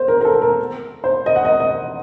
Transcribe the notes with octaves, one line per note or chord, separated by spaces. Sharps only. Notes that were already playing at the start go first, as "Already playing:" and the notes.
Already playing: C5
A#4
A#4
A4
A#4
C5
D#5
F#5
D#5
D#5